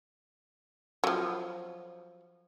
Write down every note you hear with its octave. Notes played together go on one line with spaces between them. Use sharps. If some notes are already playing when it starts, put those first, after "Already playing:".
F3 F#3